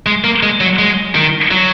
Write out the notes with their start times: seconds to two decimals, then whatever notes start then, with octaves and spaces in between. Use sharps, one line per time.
0.06 G#3
0.24 A#3
0.43 G#3
0.61 F#3
0.79 G#3
1.15 D#3
1.51 F#3